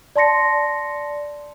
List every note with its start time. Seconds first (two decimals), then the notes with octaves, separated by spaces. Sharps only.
0.16 D5 A5 C6 A#6 C#7